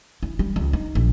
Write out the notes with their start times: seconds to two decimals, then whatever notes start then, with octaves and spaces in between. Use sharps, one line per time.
0.23 E4
0.39 G3
0.56 C#2
0.73 D#4
0.95 A#1